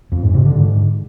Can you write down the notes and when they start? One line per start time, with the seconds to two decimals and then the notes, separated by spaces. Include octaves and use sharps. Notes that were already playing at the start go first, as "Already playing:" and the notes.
0.12 F2
0.23 G#2
0.34 C3
0.46 D3
0.57 G#2